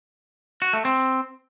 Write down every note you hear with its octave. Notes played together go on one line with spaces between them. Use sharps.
F#4
A3
C4